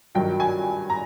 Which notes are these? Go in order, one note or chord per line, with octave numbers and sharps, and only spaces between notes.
G2 D#3 F#3 G5
G#5
A#5